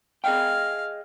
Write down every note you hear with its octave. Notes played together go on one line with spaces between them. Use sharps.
G#4 D#5 F5 G5